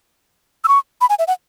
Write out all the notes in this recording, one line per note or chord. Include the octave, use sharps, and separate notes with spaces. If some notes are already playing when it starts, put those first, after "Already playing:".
E6
C#6
B5
G#5
E5
F#5